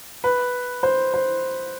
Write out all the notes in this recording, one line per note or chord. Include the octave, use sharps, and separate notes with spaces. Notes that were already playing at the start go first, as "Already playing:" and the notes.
B4
C5
C5